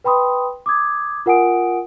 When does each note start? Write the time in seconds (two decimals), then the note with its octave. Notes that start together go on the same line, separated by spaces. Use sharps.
0.04 B4 G5 B5 C6 D#6
0.66 D6 D#6 G#6
1.26 F4 A#4 F#5 G#5 D#6 D7